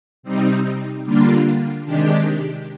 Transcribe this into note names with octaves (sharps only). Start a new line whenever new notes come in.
C3 G3 C4 D#4
D3 G3 A#3 D4 F4
C3 D#3 G#3 D4 G4